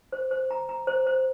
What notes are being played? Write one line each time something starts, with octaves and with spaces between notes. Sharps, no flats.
C5
C5
A#5
A#5
C5
C5